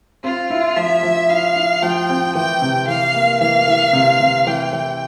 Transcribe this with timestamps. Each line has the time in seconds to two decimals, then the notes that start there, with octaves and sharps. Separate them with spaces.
0.24 C4 F4
0.50 E4
0.76 F3 E5
1.03 F3
1.29 E4 F5
1.56 E4
1.82 F3 G5
2.09 C4
2.35 E3 G5
2.62 C3
2.88 E3 F5
3.15 A#3
3.41 E3 F5
3.68 E3
3.93 C3
4.20 C3
4.47 E3 G5
4.73 E3